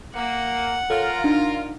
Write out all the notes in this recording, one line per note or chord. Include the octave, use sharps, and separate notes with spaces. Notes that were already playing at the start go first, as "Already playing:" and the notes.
A#3 F#5
F4 A4 A#4 C#5 F6
D4 D#4